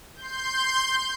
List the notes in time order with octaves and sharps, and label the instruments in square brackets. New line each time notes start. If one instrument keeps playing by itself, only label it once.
[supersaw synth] C6 G6